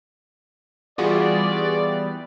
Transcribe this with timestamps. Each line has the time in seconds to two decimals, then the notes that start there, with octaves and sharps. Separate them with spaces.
0.98 E3 G3 B3 F4 F#4 G#4 D5